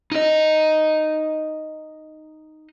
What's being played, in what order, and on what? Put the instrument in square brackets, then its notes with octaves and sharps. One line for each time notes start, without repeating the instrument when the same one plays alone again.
[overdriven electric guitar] D#4 D#5